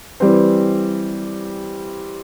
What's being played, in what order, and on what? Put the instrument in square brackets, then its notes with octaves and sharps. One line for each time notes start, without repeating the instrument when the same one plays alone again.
[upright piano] E3 G3 C4